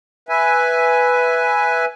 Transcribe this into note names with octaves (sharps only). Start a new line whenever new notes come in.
B4 E5 G#5